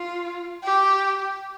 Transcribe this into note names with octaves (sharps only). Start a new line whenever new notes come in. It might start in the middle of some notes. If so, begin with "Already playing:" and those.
Already playing: F4
G4